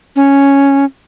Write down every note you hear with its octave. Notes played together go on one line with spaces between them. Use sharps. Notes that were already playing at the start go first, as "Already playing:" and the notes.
C#4